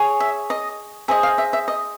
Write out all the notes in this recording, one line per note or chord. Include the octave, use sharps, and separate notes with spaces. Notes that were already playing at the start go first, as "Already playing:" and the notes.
Already playing: G#4 C#5
E5
D#5
G#4 C5 D#5 E5
F5
E5
E5
D#5